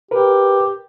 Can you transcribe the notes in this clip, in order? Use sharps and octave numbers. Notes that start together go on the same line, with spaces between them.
G4 A#4 B4